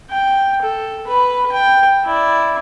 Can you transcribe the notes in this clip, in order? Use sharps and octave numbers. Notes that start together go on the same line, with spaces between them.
G5
A4
B4 B5
G5
E4 D5